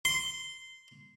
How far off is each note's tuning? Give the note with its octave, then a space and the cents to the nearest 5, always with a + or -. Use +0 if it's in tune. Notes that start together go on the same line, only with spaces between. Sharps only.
C6 -15